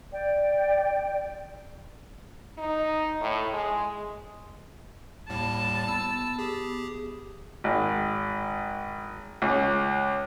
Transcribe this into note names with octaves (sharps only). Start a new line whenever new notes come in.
D5 G5
D#4
A2
G#3
D#2 A2 G3 A5
B3 E6
G4 G#4
G#1
C#2